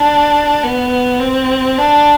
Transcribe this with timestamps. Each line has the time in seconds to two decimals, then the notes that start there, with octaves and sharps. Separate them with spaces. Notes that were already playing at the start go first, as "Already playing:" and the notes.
Already playing: D4
0.63 B3
1.20 C4
1.78 D4